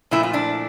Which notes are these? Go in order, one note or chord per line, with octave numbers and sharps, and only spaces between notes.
A#2 F3 A3 E4
F4
D4 E4